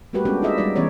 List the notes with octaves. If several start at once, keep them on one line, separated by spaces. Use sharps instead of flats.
G3 A3 A#3 F#4 G4 B4
G#3 B3 C#4 D4 F#4 G4
D#4 F4 G#4 D#5 E5
G3 G#3 D#4 D5
E3 B3 C#4 C#5 D5